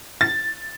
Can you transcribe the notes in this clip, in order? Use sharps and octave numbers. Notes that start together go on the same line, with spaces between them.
A6